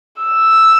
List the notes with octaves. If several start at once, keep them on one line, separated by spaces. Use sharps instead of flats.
E6